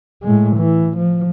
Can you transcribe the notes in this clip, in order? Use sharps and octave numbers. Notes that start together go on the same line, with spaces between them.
A2 G#3
E3
F3